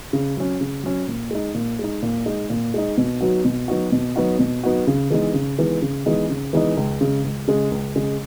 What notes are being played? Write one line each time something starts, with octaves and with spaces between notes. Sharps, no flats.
C#3
F#3 C#4
C#3
F#3 C#4
A#2
G#3 D#4
A#2
G#3 D#4
A#2
G#3 D#4
A#2
G#3 D#4
B2
F#3 B3 D#4 F#4
B2
F#3 B3 D#4 F#4
B2
F#3 B3 D#4 F#4
B2
F#3 B3 D#4 F#4
C#3
E3 G#3 B3 D#4
C#3
E3 G#3 B3 D#4
C#3
E3 G#3 B3 D#4
C#3
E3 G#3 B3 D#4
C#2
C#3 G#3
C#2
C#3 G#3
C#2
C#3 G#3